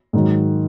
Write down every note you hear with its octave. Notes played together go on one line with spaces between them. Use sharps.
G#2 D#3 F#3